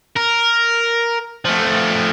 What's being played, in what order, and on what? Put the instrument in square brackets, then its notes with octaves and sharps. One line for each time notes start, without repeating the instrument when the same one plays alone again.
[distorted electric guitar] A#4
F3 A3